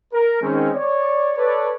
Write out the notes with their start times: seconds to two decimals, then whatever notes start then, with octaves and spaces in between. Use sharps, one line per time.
0.13 A#4
0.41 D#3 G#3 C4 C#4
0.73 C#5 D5
1.36 A4 B4 C#5 D5